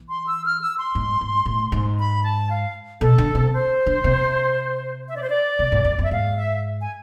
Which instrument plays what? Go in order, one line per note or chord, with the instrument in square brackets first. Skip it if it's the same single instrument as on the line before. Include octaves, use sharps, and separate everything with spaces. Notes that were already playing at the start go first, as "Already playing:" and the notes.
Already playing: [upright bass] E3
[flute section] C6
E6
F6
E6
C6
[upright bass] G#2
G#2
A2
G#2
[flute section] B5
A5
F5
[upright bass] B2 [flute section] A4
[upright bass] D3
C3
[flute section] C5
[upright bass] D3
C3
[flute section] E5
D5
C5
D5
[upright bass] C3
G#2
F2
F2
[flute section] E5
[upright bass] G#2 [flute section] F5
[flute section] E5
G#5